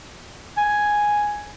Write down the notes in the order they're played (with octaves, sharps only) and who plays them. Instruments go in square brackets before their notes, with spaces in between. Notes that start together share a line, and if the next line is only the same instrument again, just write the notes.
[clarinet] G#5